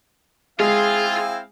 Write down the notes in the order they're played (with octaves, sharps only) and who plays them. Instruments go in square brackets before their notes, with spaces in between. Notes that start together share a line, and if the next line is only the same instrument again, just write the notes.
[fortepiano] G#3 [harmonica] C4 E4 F5 [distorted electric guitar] F4 [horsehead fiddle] G#4